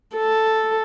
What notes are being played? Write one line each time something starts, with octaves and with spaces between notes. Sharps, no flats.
A4